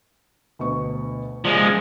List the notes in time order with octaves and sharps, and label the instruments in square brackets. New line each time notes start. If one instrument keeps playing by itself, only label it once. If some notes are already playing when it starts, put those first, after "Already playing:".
[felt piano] D2 B2 C#6
[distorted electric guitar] F3 G#3 [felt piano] D5